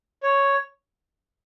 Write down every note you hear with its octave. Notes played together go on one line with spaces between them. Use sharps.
C#5